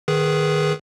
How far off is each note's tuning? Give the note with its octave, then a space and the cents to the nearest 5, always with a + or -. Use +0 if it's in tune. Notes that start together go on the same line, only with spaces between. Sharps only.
D#3 -20 G#4 +0 B4 +0